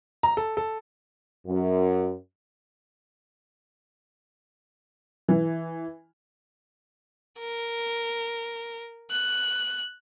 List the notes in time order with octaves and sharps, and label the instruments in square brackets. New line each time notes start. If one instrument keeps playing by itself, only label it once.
[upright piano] A#5
A4
A4
[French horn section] F#2
[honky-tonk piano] E3
[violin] A#4
F#6